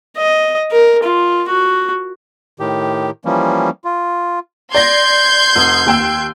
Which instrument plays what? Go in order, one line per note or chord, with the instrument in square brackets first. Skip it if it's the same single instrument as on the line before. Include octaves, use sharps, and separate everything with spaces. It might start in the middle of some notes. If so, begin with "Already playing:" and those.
[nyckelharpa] D#5
A#4
F4
F#4
[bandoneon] A2 D#3 G4
E3 F3 G3 A#3 C#4
F4
[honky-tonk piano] D5 A#6 [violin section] C6 G6 G#6
[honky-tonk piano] F1 D#6
D#2 G5 E6